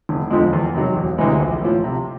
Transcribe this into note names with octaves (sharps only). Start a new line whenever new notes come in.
F1
F2 D3 F3 G#3
E2
C3 D#3 F#3
E1
D2 C3 E3 G#3
A#1
A2 F3
C3